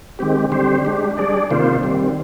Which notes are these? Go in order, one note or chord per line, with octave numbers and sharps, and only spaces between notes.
D#3 G#3 C4 G4
D3 G3 C4 G4 C5
G#3 D4 G4
G3 D4 G#4 D5
C3 D#3 A#3 F4 C5
D#3 G3 C4